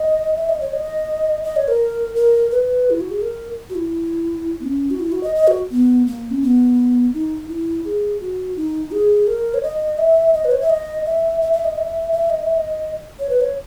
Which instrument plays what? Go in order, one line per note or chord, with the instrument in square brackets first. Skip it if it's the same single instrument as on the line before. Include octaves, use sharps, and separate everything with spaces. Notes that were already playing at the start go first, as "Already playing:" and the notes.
Already playing: [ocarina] D#5
E5
D#5
C#5
D#5
D#5
C#5
A#4
A#4
B4
E4
F#4
G#4
A#4
F#4
E4
B3
C#4
F#4
E4
F#4
D#5
D#5
F#4
B3
A#3
C#4
B3
D#4
E4
G#4
F#4
D#4
G#4
A#4
C#5
D#5
E5
D#5
B4
C#5
E5
D#5
E5
E5
E5
D#5
E5
E5
D#5
E5
D#5
C#5
B4
C#5